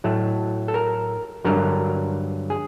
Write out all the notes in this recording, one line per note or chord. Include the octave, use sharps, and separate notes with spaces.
A2 F#3 A3
A4
A#4
G2 D3 F#3 A#4
G#4